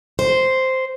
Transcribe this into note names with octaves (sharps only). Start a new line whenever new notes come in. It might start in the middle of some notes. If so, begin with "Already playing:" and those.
C5